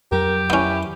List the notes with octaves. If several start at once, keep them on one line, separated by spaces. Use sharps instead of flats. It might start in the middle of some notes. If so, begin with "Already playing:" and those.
F2 F#3 G4 A#4
B3 C#4 E4